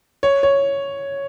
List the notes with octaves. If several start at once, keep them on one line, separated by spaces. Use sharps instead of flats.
C#5
C#5